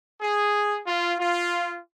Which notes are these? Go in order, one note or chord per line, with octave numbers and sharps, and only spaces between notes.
G#4
F4
F4